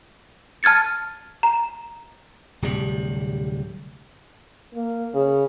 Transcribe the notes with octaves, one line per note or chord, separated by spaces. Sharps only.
A5 F6 G#6 A6 C#7
A#5
D1 C3 G3
A#3
C#3